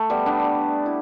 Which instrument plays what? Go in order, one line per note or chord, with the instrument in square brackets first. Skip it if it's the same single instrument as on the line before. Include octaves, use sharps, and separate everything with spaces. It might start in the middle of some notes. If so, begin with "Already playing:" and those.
Already playing: [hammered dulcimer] A3
G3 B3
B3 D4
E4